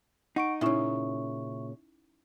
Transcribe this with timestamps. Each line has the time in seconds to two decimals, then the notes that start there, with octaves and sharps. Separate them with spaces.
0.36 D#4 F#5 C#6 D7
0.61 A#2 C#3 C#4 D#4 E4 E5 C#6